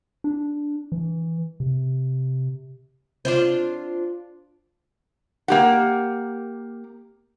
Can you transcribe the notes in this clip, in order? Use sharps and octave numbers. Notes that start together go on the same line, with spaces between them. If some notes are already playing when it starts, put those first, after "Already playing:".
D4
E3
C3
D4 F4 C5
A#3 G4 F#5